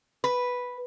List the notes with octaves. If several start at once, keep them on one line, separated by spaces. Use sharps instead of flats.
B4